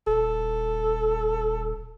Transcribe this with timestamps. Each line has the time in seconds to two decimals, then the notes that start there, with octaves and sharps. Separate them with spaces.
0.07 D#1 A4